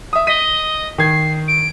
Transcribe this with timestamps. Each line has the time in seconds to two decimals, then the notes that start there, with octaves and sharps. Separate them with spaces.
0.13 E5 D#6
0.27 D#5 B6 D#7
0.98 D#3 G#6 C7
1.47 D7